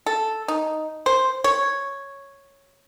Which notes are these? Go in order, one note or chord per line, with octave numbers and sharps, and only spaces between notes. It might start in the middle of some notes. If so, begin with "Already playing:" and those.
A4
D#4
C5
C#5